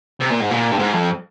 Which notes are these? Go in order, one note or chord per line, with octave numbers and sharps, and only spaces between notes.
C3
A#2
G#2
A#2
G2
G#2
F2